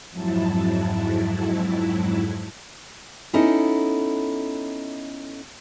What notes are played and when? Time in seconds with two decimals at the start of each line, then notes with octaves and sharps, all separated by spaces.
0.11 F2 G#2 F#3 E4 A5
3.33 B3 C#4 D#4 E4 A4 D#5